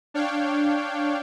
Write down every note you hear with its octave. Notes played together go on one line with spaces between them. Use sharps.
D4 C#5 F5 G5